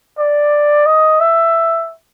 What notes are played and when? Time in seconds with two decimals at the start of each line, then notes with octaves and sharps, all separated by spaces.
0.18 D5
0.86 D#5
1.20 E5